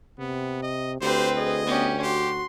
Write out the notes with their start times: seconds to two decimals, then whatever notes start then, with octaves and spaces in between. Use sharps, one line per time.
0.19 C3 B3
0.62 D#5
1.01 D2 C4 G4 B4 C5
1.37 G#4 D#5
1.66 B3 C#4 G4
2.02 F#4 G4 C6